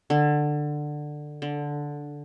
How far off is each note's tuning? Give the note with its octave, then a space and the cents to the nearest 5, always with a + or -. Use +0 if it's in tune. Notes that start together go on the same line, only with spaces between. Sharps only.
D3 +15
D3 -5